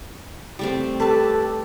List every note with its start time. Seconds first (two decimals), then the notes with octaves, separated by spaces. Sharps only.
0.59 G3 A3 C4
1.00 G4 A4 B4 A5